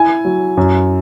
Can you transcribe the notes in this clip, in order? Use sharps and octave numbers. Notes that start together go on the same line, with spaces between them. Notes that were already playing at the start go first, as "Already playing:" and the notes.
Already playing: E4 G#5
F#3
F#2